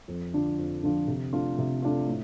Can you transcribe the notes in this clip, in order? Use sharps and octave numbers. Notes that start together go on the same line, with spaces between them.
F2
D3 F3 D4 F4
F2
D3 F3 D4 F4
C3
A3 D4 F4
C3
A3 D4 F4
A2